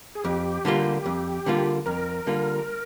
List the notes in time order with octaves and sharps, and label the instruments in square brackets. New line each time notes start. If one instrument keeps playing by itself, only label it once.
[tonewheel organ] G#4
[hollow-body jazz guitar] F2 [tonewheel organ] G4
[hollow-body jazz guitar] D3 G3 A#3 F4
F2
D3 G3 A#3 F4
[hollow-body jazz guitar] F2 [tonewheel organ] A#4
[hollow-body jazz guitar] D3 G3 A#3 F4